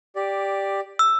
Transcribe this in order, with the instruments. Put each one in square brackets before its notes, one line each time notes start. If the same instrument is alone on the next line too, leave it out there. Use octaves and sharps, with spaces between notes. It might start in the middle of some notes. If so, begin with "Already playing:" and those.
[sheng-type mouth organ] G4 D5
[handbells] E6